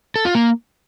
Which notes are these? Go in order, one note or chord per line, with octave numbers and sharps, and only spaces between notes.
A4
F4
A#3